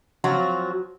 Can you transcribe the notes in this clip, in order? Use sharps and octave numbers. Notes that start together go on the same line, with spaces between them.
F3 F#3 C4 F#4